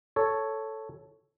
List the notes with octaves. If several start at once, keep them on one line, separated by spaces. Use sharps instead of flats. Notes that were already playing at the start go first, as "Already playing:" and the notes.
A4 C#5